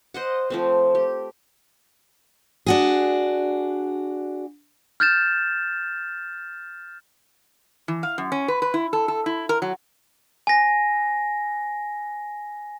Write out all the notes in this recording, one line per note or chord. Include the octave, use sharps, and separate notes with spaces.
C5 D#5 F#5
F3 A3 C4
G4
D4 F#4 G#4
F6 G6 A6 E7
E3
F5
F#2
C#4
B4
B4
E4
A4
A4
E4
A#4
F#3
G#5 A#6